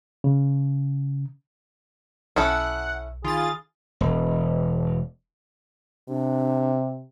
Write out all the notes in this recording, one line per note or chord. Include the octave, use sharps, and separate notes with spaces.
C#3
B1 C#4 E4 A4 F#5
D#3 F4 G#4 B5 A6
E1
C3 D4